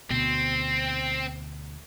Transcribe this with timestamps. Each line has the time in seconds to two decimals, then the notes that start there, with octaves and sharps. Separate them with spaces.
0.11 D2 B2 C4